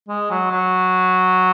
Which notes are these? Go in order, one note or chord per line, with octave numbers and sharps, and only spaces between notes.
G#3
F#3
F#3